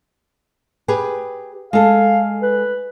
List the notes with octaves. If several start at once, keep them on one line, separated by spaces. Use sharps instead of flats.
G4 G#4 B4
G#3 A4 F5
B4